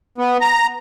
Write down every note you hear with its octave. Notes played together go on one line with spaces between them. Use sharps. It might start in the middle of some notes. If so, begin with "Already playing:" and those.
B3
A#5